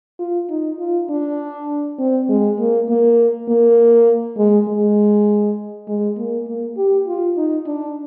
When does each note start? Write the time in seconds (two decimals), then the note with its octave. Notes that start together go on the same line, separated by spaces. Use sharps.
0.19 F4
0.50 D#4
0.79 F4
1.09 D4
1.99 C4
2.29 G#3
2.59 A#3
2.89 A#3
3.48 A#3
4.37 G#3
4.68 G#3
5.88 G#3
6.18 A#3
6.48 A#3
6.77 G4
7.07 F4
7.37 D#4
7.67 D4